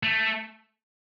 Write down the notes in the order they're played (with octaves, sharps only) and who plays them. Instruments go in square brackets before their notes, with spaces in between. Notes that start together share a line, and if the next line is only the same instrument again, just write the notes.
[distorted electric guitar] A3